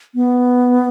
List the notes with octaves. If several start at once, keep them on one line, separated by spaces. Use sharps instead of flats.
B3